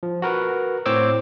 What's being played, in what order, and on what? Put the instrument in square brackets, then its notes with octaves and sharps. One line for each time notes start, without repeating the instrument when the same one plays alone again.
[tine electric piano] F3
F#4 A#4 B4
A2 C4 C5 C#5 D6 E6